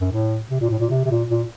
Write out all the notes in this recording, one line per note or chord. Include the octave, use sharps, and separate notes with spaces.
F#2
A2
C3
A#2
A2
A#2
C3
C3
A#2
A#2